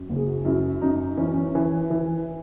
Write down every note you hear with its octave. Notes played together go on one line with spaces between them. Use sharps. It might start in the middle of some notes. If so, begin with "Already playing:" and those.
Already playing: F#2
F#1
G#4
F#4
F#2 E4
F#2 D#4
E3 C#4
C#4
E3
E3